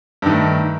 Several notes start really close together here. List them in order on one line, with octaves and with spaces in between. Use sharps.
G2 D#3 A3